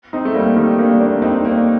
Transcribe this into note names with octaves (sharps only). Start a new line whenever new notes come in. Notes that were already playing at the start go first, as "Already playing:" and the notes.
C4 D#4
A3
G3 A#3
D#3 G3
A#3 D4
A#3 D4
C4 D#4
A#3 D4